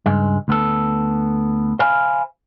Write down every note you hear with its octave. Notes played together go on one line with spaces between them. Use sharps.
C#2 G2 G#3
D2 B3 A4
C5 E5 F5 G#5 B5